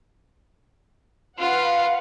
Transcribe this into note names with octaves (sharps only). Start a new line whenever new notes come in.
F4 B4 F5 F#5